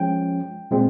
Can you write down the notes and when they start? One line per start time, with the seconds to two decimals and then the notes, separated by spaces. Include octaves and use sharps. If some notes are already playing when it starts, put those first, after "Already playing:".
Already playing: F3 G#3 C#4 G5
0.71 A#2 G#3 C4